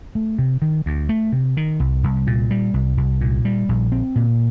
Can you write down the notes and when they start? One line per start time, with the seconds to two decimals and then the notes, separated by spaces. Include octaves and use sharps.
0.15 A3
0.39 C3
0.62 D#3
0.86 D2
1.09 A3
1.32 C3
1.57 D#3
1.80 C2
2.03 C2
2.27 A#2
2.51 G3
2.74 C2
2.97 C2
3.21 A#2
3.45 G3
3.69 A#1
3.92 C4
4.16 A#2